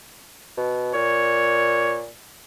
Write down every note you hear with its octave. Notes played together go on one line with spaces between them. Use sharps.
B2
A#2 C#5